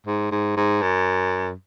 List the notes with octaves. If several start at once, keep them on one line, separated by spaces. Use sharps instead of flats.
G#2
G#2
G#2
F#2